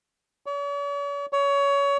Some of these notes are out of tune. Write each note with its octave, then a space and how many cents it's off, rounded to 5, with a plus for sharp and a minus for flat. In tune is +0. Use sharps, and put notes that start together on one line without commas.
C#5 +45
C#5 +25